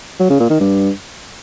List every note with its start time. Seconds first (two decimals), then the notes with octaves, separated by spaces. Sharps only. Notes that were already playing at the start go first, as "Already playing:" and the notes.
0.20 F#3
0.30 C#3
0.40 A#2
0.50 D#3
0.60 G2